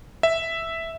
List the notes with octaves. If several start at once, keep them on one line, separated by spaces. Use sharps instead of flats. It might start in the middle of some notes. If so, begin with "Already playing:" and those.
E5